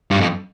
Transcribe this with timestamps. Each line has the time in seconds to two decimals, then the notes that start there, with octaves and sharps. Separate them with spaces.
0.11 G2
0.20 F2